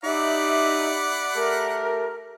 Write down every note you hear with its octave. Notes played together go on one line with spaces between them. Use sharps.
D#4 G4 D5 E5 F#5 B5
A3 G4 A#4